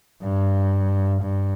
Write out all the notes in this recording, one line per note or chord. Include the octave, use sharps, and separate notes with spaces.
G2
G2